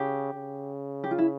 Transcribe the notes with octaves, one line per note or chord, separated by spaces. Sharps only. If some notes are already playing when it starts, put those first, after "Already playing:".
Already playing: C#3 G4
C#3
G4
F4
E4